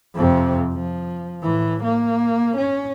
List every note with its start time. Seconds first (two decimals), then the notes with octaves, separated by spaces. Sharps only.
0.15 F2 C3
0.73 F3
1.42 A2 E3
1.84 A#3
2.57 C#4